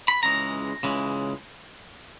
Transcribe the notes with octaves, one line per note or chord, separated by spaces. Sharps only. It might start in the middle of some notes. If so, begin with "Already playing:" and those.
B5
C#2 C#3 E3 G#3 A#5
C#2 C#3 E3 G#3